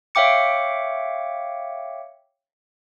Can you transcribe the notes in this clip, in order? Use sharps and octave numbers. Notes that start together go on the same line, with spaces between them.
C#5 E5 F5 G5 D6 C#7